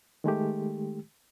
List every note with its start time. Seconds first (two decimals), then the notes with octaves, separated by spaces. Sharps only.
0.24 D#3 G#3 A3 G4